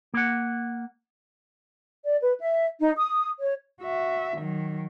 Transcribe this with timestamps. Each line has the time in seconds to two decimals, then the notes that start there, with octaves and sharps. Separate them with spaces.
0.14 A#3 F#5
2.06 D5
2.22 B4
2.40 E5
2.81 D#4
2.97 D#6
3.40 C#5
3.82 F#4 E5
4.37 D#3 F#3